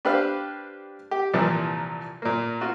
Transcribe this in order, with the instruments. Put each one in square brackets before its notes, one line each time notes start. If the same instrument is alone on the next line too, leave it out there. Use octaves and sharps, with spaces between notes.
[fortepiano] D4 G4 B4 C5 F5
G4
C2 A#2 E3 F3
A#2 A#3
F4 F#4